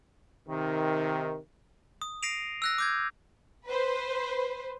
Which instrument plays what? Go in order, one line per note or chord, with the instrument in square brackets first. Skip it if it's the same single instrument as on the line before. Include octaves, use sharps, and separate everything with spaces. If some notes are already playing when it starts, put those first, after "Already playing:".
[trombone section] C3 D#3
[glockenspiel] D#6
A#6 C7 D7 D#7 F7
E6 F#6 A#6
D6 G6 G#6
[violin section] B4 C5